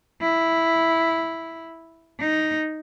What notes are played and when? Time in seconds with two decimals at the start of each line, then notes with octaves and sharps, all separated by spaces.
0.21 E4
2.20 D#4